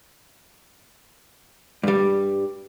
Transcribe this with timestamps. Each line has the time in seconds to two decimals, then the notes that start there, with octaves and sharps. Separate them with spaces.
1.83 G2 G3